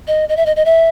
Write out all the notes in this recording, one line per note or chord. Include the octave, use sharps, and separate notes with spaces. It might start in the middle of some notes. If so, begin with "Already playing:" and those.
D#5
D#5
E5
D#5
D#5
E5